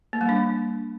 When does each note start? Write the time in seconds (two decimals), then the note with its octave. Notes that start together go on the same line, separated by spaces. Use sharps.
0.13 A#3
0.21 G3
0.29 D4